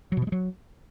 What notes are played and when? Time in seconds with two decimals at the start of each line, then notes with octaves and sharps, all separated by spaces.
0.12 F#3
0.17 B2
0.22 F3
0.27 G#3
0.32 F#3